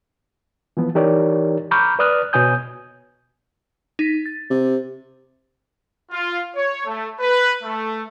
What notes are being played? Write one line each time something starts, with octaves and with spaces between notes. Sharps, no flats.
E3 F3 B3
E3 D#4 G4 A#4 C#5 D5
A#5 B5 C#6 D6 F6 G6
B4 D5 D#6 F6 F#6
B2 B3 C#5 G#5 D#6 G6
D#4 B6
A6
C3
F4
C#5
A3
B4
A3